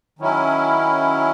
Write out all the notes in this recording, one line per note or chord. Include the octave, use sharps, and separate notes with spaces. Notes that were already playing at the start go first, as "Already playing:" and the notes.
D#3 F#3 C#4 E4